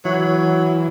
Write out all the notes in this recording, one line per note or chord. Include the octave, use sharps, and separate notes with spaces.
E3 F#3